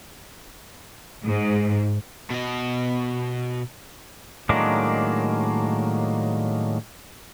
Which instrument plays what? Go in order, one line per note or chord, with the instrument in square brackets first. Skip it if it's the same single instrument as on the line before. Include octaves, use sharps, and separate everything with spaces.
[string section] G#2
[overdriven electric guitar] B2 D#5
[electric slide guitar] A2 D#3 F#3 G#3 A#3 D4